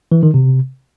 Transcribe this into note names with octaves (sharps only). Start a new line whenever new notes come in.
E3
D#3
C3